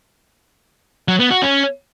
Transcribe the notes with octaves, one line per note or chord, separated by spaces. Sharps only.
F#3
B3
F#4
C#4